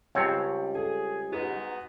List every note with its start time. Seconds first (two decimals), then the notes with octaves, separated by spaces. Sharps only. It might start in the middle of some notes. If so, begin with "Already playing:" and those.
0.15 C#2 G3 C4 C#5 G5 A5
0.75 G#4 A4
1.32 G#2 B3 D#4 F#4 G#4 B4